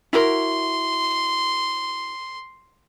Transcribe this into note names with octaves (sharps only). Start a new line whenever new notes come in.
E4 F#4 A#4 C6